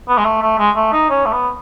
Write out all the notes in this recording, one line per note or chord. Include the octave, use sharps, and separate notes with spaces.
B3
G#3
A3
A3
G#3
A3
D#4
C#4
A3
B3